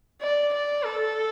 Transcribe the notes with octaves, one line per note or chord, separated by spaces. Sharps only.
D5
D5
A4